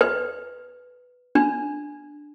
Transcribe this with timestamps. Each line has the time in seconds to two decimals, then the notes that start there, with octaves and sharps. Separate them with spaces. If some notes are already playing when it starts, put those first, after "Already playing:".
0.01 B4
1.35 D4